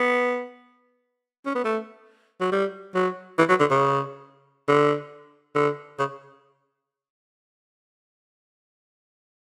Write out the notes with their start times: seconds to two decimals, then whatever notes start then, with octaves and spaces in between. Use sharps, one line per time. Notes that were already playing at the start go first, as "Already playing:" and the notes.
Already playing: B3
1.46 C#4
1.55 B3
1.65 A3
2.41 F#3
2.52 G3
2.95 F#3
3.39 E3
3.49 F#3
3.60 D3
3.71 C#3
4.68 D3
5.55 D3
5.99 C#3